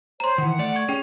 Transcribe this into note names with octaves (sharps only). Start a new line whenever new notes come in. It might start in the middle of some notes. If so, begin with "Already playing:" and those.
C5 C#5 A#5 C6
D#3 E3 F#5
A3 D5
C#6 G#6
C#4 G#4 G5